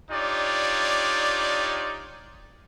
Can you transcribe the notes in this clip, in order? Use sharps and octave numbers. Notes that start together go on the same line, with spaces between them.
D4 D#4 F4 G4 C#5 D5